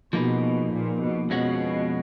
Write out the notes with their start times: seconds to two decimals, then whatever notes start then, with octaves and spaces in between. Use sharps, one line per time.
0.13 B2 F3 A#3 D#4 G#4 B4
0.71 A#2
1.01 B2
1.30 F2 B2 F3 G#3 C#4 F#4